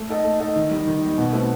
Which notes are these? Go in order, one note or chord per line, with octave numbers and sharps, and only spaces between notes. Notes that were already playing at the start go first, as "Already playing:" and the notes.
Already playing: A3
D#4 A4 D#5
A3
D#4 A4 D#5
D#3
G3 D#4
D#3
G3 D#4
B2
A3 C4 F#4 B4